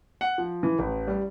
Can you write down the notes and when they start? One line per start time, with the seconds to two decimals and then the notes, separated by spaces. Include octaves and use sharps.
0.21 F#5
0.38 F3
0.63 E3
0.79 A1
1.08 G3